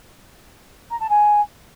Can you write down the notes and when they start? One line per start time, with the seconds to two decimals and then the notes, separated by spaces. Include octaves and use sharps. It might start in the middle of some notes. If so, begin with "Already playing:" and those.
0.90 A#5
1.00 A5
1.09 G#5